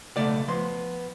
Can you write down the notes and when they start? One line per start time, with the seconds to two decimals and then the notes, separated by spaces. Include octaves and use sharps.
0.16 B1 F2 C#3 A3 D5 F#5
0.48 F3 B3 C6